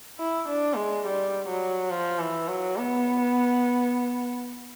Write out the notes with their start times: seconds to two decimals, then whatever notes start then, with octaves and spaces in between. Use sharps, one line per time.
0.19 E4
0.48 D4
0.76 G#3
1.06 G3
1.49 F#3
1.90 F3
2.19 E3
2.48 F#3
2.77 B3